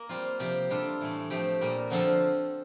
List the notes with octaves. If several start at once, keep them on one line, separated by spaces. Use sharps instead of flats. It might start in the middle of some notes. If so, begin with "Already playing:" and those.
Already playing: A#3
G3 C4 F4
C3 F3 C4 G4
G3 D4 F4 A4
A2 E3 A3
F3 A3 C4 G4
A#2 G3 A#3
D3 F3 C4 F4 A4